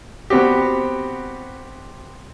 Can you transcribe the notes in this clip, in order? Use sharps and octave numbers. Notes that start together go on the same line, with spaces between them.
B3 C4 F#4 G4